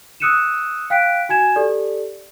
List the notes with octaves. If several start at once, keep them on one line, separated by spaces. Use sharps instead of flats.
D#6 E6 F#6 C#7 D#7 E7
F5 G5 F#6 B6 D7
F#4 G#5 G#6 E7
G4 A4 D5